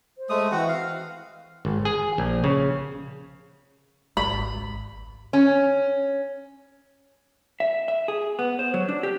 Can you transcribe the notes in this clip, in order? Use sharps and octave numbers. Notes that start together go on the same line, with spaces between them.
C5
G#3 A3 D#6
E3 C4 F#4 F#5
F5
G#1
G#4
A#1
C#3
G#1 C#2 B5
C#4
E5
E5
G#4
B3
C5
F#3
D4
G4